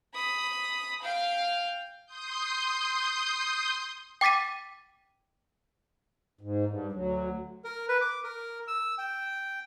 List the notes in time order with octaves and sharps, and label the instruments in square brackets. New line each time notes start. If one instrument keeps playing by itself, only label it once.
[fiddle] B5 D#6
F5 G5
[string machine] C6 D#6 G6
[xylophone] G5 D6 A6 B6 D#7
[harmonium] G#2
G2
D2 F#3
[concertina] A#4
B4
D6
A#4
E6
G5